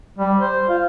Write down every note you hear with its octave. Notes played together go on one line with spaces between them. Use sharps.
G3
C5
F4